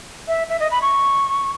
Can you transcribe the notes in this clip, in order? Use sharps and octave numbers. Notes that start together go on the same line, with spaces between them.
E5
E5
D#5
B5
C#6